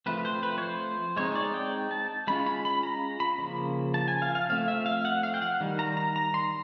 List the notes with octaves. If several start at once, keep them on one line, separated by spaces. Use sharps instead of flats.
F3 A3 C4 B4
C5
B4
C#5
C5
G#3 C4 D#4 C#5
D5
G5
A5
G#3 C#4 F4 B5
B5
B5
A#5
B5
C#3 F3 A#3
A5
G#5
F5
F5
F3 A3 C4 F5
E5
F5
F#5
F5
G5
F#5
D#3 G3
A#5
A#5
A#5
C6